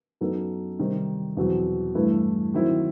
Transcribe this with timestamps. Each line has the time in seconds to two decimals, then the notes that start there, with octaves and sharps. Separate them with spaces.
0.21 F#2 F#3 B3 D#4 A4
0.79 C3 D#3 G3 C4 D#4
1.37 E2 B2 F#3 C4
1.95 G2 E3 A3 E4 B4
2.54 D#3 F#3 C4 E4